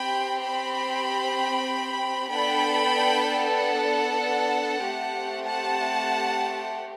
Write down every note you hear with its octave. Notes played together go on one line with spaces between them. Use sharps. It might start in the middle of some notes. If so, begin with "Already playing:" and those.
Already playing: C4 G4 G5 B5
G5 B5
B3 D4 A4 G5 B5
F#5 A5
A3 C4 G4
F#5 A5